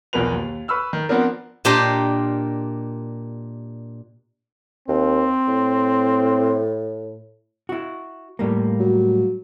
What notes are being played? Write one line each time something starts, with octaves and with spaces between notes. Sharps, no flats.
B1 E2 F3 A#4 B4 F7
D#2
B4 B5 C#6 E6 F6
D#3
F3 B3 C4 D4 A#4
A#2 D4 G4 A#4 C5 D#5
D#2 C4
A2
E4 F#4
A2 G3 A#3
F#3